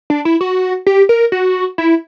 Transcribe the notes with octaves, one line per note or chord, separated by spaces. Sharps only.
D4
E4
F#4
G4
A#4
F#4
E4